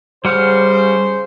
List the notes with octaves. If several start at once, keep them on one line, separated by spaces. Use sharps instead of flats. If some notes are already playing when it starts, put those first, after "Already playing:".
C#3 G3 C5 F#5 F6